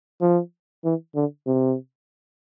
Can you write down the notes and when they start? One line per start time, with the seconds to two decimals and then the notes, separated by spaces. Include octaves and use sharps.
0.21 F3
0.84 E3
1.15 D3
1.47 C3